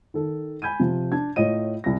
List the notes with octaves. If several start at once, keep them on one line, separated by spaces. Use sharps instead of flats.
D#3 A4
G#5 B5 G6 G#6 D#7
C3 F3
D4 A5 G#6
A2 F4 C#5 D#5 D#7
C2 A#6